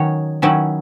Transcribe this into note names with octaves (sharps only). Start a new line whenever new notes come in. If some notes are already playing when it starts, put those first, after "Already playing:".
Already playing: D#3 F#3 C#4 C#5
D#3 F#3 C#4 E4